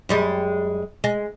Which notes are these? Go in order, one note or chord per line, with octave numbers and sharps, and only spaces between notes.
F#2 G3 G#3
G#3